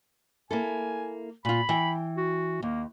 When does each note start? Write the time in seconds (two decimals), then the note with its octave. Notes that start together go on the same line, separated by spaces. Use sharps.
0.51 A#3 E4 A4 G#5
1.45 A#2 F4 B5
1.69 E3 G5
2.17 F#4
2.63 D#2 A#3